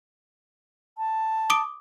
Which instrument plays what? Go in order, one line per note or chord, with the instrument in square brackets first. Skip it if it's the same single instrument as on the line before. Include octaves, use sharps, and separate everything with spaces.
[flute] A5
[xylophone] D6 D#6 D7